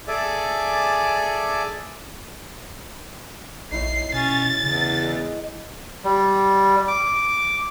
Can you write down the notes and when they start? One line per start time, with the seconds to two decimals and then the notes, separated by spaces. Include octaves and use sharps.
0.08 G#4 A4 D5 E5 G#5 D6
3.72 A#1 D#4 E4 C#5 C7
4.14 B2 C#4 A6
4.63 E2 C#3
5.03 G#3
6.04 G3
6.88 D6